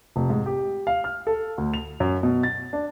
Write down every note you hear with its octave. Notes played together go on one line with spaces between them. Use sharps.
F1
G#2
G4
F5
F6
A4
D2
F7
F#2
B2
A6
D4